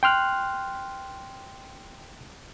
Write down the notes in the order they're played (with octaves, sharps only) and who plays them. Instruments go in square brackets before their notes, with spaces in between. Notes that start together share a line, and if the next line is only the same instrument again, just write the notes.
[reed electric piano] G5 C6 F6 F#6